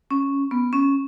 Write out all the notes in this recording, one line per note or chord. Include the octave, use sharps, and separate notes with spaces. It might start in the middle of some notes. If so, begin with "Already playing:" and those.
C#4
B3
C#4